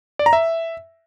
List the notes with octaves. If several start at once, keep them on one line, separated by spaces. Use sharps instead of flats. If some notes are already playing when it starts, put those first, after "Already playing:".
D5
A#5
E5